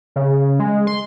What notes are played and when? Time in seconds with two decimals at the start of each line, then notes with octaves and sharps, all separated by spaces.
0.16 C#3
0.60 G#3
0.87 C6